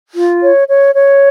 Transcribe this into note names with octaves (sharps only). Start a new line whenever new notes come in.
F4
C#5
C#5
C#5